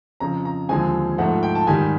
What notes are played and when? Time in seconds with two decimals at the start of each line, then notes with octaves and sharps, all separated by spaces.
0.20 F2 C#3 F3 A#5
0.45 A#5
0.69 D#2 D3 F3 G#3 C4 G#5
1.18 G#2 F3 A3 F#5
1.43 G5
1.55 A5
1.67 G#2 D#3 G3 G#5